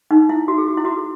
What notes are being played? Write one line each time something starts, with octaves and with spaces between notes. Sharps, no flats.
D#4
E4
F#4
G#4
F#4
E4
F#4
G#4